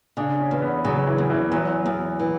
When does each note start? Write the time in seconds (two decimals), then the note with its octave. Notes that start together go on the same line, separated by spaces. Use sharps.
0.17 C#3 D4
0.40 C#4
0.51 E2
0.62 B3
0.84 C#3 F#3
1.07 E3
1.18 E2
1.30 E3
1.52 E2 F#3
1.86 E2
2.19 E3